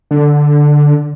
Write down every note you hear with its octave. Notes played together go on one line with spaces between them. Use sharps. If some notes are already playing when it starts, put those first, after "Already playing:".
D3